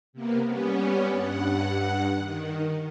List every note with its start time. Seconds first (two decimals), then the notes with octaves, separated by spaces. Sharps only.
0.13 C3 A#3 B3
0.46 G3 B3 C#4
1.10 G2 F#5
2.17 D#3